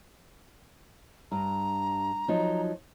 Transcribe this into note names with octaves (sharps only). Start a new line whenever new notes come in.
G2 A#5
F3 F#3 D#4